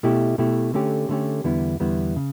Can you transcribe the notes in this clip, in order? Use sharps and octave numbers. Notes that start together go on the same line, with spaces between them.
B2 A3 E4 G4
B2 A3 E4 G4
D3 A3 C#4 G4
D3 A3 C#4 G4
E2 D3 G3 B3 E4
E2 D3 G3 B3 E4
C#3